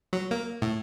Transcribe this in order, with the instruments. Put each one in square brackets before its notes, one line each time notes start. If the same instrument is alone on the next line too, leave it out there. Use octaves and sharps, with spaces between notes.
[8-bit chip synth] F#3
A#3
A2